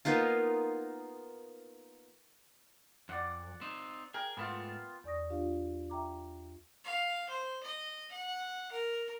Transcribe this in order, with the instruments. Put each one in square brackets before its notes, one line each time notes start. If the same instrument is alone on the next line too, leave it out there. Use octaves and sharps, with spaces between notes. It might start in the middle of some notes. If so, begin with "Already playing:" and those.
[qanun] A#3 B3 D#4 F4
[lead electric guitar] F2 [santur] D5 F#5
[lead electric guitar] C4 D#4
[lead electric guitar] G#4 [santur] A#4 G5
[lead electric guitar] G#2 A3 [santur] B3 F4
[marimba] E2 D5 C#6 D#6 A#6
D4 F4 G4 F5
E5 G5 A#5 D6
[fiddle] F5
C5
D#5
F#5
A#4